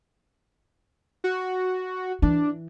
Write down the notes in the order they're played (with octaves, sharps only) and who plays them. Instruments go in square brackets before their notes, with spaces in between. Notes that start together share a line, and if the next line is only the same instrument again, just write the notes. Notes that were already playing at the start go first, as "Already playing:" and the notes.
[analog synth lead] F#4
[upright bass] E3 [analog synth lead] D4